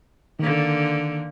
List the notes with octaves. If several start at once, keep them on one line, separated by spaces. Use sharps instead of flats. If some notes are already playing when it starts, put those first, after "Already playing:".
D3 D#3 A#3